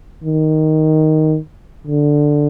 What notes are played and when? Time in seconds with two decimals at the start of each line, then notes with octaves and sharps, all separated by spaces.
0.24 D#3
1.87 D3